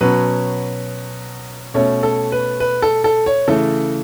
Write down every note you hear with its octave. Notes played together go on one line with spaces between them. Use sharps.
B2 F#3 C#4 B4
B2 A3 C#4 C#5
A4
B4
B4
A4
A4
C#5
C#3 E3 A3 A4